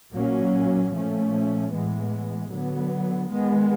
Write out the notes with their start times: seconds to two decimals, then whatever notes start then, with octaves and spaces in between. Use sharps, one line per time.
0.13 A#2 F#3 A#3 C#4
0.91 A#2 F3 A3 C#4
1.70 A2 E3 G#3 B3
2.50 D3 F#3 B3
3.28 D#3 G#3 B3